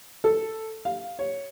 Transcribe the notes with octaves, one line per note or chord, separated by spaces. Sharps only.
A4
F5
C#5